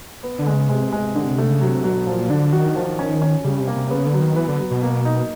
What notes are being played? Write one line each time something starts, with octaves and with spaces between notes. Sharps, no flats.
B3
D3
G#3
C#3
C3 G#3
G#3
D3
A3
C#3
C3 F#3
B2 F#3
A#2 F3
D3 D4
D#3 F#4
F3
C#4
C#4
C#3 G3
C3
A#3
C3
C#3 B3
D3
F#3
D#3
E3 B3
D3
F#3
B2
A#3
D#4